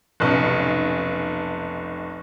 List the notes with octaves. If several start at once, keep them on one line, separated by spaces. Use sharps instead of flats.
F1 B1 C#4